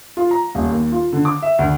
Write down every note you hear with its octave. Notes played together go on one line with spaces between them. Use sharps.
F4
A#5
D#1
D#2
F4
D3
D6
E5
D2